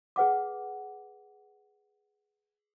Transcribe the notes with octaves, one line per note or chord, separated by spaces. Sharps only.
G#4 B4 F#5 D6